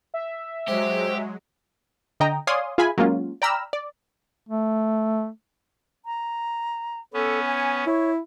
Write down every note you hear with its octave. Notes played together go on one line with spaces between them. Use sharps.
E5
F#3 G#3 G4 C5
D3 D#5 G5 A#5
C#5 D5 F5 G#5 C6 D#6
F4 G#4 E5 G#5 B5
F#3 G#3 A#3 C#4 F4
D5 G5 A#5 B5 E6 F6
D5
A3
A#5
B3 C#4 A4
G#5
E4 C#5